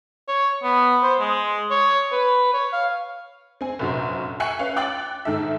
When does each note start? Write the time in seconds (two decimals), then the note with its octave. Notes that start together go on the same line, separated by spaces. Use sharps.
0.28 C#5
0.63 B3
1.03 C5
1.20 G#3
1.71 C#5
2.12 B4
2.53 C#5
2.73 F5
3.61 C4 G#5
3.79 F1 A#1 F#2 F#4 C5
4.40 E5 G5 G#5 C#6 F#6 C#7
4.59 C#4 B4 F5
4.76 G5 D6 F#6 A6 F#7
5.25 G#2 D#3 A4 E5